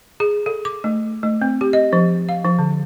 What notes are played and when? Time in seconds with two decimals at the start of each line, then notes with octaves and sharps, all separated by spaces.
0.20 G#4
0.46 A4
0.65 D6
0.84 A3
1.23 A3
1.42 C4
1.61 G4
1.73 D#5
1.93 F3
2.29 F5
2.45 F3
2.59 D3